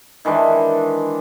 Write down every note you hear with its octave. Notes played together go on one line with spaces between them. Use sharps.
D#3 E3 G#3 D4